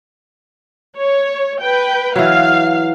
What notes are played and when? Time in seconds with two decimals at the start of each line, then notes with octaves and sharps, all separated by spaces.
0.97 C#5
1.60 B4 G5
2.16 E3 F#3 F5